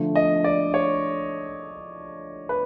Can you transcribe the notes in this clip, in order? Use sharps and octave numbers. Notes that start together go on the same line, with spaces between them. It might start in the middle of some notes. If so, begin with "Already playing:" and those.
Already playing: D3 F3 A3
D#5
D5
C#5
B4